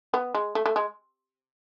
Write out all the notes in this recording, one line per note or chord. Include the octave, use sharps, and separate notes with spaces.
B3
G#3
A3
A3
G#3